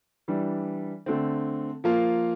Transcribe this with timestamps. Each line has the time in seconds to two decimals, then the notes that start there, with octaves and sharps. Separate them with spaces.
0.28 E3 G3 D4
1.06 D3 A3 C4
1.84 F3 A#3 F4